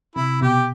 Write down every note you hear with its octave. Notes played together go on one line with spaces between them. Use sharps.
C3 E4
B2 G4